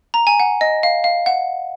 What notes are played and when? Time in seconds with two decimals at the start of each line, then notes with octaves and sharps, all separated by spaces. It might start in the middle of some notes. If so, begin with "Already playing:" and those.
0.14 A#5
0.27 G#5
0.40 F#5
0.61 D#5
0.83 F5
1.04 F5
1.26 F#5